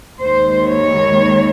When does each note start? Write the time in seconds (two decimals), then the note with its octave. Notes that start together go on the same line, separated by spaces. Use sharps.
0.21 D#2 D#3 G#3 C5
0.69 C#5